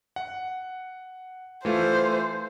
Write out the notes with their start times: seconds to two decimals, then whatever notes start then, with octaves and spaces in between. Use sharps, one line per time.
0.16 F#5
1.65 E3 A3 F4 C5